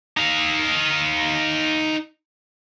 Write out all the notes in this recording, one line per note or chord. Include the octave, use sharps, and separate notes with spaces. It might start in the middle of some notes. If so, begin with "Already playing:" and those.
D#4 F5